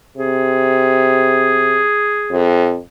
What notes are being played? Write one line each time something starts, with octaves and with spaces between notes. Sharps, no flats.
C3 G#4
F2